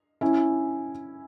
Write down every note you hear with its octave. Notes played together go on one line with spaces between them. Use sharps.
C#4 E4